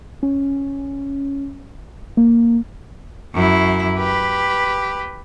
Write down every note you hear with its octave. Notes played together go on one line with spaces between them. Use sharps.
C#4
A#3
F#2 E4
G4 B4